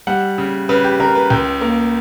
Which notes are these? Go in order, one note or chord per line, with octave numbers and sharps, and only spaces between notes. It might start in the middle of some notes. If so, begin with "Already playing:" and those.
G3 F#5
C#3
C#3 B4
G4
C#3 A#4
B4
C#2 G5
A#3